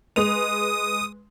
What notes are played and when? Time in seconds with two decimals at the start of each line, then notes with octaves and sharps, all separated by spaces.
0.16 G#3 B4 D#6 F7